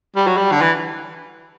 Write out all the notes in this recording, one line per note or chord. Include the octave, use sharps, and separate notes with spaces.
G3
F#3
G3
D3
E3